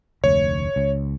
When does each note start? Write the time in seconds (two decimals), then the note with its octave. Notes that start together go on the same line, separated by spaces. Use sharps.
0.24 F1 D2 C#5
0.76 C#2